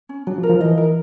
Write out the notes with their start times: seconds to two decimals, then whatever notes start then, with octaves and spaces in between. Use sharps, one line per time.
0.09 C#4
0.27 F#3 D4
0.38 F3
0.43 A#4
0.49 F3
0.60 E3 D#5
0.77 A#4